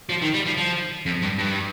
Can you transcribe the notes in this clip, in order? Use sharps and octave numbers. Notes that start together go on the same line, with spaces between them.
F3
D#3
G3
F3
F3
F2
G2
G2